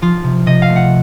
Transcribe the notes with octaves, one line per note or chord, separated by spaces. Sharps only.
F3 F4
C3
C3 D#5
F5
A3
F#5